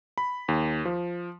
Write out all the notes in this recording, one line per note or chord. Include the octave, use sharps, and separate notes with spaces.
B5
D#2
F3